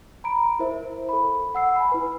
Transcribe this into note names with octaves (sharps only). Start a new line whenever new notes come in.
A#5 B5 D7
E4 A#4 C5 E5
A4 B5
F#5 E6 C7
G#5 B5
E4 B4